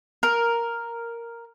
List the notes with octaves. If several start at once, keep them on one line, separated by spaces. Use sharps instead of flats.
A#4